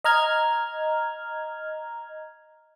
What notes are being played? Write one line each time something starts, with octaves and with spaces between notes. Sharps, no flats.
D#5 A#5 F6 G#6